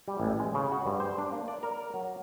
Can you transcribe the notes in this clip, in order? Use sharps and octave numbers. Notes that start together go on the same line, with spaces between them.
G3
A1
G#3
C#3
F#4
G2
C5
D4
A#3
D5
A#4
F#3